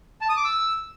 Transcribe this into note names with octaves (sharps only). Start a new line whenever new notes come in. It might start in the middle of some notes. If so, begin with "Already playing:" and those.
A5
D#6
D6
E6